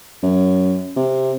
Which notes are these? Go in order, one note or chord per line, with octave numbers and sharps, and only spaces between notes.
F#2
C3